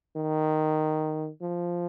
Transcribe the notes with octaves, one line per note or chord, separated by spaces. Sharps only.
D#3
F3